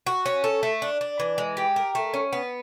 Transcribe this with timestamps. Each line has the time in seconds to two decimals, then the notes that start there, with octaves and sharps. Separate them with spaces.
0.07 F#4
0.26 C#4
0.44 A4
0.63 A3
0.82 D4
1.01 D4
1.20 E3
1.38 G#3
1.57 G4
1.76 A#4
1.95 A3
2.14 C#4
2.33 B3